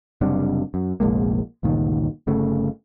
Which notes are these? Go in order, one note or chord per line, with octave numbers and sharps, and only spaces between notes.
F#1 C3 G3 D4
F#2
F1 A#1 G#3 A#3
G1 C#2 A#2 D#3
G1 C#3 A3